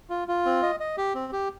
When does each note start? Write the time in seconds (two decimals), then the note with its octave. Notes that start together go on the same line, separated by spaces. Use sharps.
0.10 F4
0.28 F4
0.45 C4
0.62 D#5
0.80 D#5
0.97 G4
1.15 C4
1.33 G4